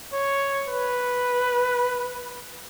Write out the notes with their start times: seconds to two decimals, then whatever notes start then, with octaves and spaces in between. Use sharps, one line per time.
0.13 C#5
0.68 B4